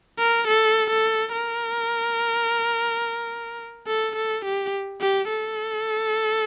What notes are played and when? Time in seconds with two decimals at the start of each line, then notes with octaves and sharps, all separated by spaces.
0.19 A#4
0.47 A4
0.90 A4
1.32 A#4
3.87 A4
4.15 A4
4.45 G4
5.01 G4
5.29 A4